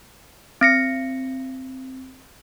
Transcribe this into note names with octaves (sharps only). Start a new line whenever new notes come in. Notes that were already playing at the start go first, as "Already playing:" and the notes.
C4 A#6 C#7